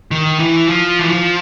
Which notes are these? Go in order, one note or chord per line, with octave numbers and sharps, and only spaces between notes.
D#3
E3
F3
E3
F3